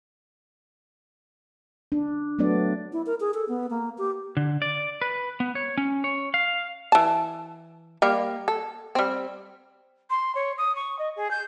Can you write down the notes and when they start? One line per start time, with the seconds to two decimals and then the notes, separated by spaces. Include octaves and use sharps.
1.92 D4
2.39 F#3 A3 B3 D4 D5
2.93 E4
3.06 A#4
3.20 G#4
3.34 A4
3.48 B3
3.70 A#3
3.98 G4
4.37 D3
4.62 D5
5.02 B4
5.40 B3
5.55 C#5
5.78 C#4
6.04 C#5
6.34 F5
6.92 E3 A5
8.02 G3 A#3 G4
8.48 A4
8.95 G3 C4
10.10 C6
10.35 C#5
10.58 D#6
10.76 C#6
10.99 D#5
11.16 G#4
11.31 G6